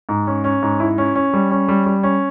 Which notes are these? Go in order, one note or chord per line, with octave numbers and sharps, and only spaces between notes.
G#2
C#4
C#4
G#2
E4
C#4
C#4
G3
C#4
G3
G3
C#4